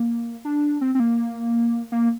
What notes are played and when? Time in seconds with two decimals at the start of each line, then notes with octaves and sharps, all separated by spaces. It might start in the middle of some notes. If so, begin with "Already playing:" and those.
Already playing: A#3
0.45 D4
0.81 C4
0.95 C4
1.00 A#3
1.92 A#3